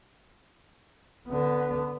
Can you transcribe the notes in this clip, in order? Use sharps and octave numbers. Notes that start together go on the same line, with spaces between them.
D3 B3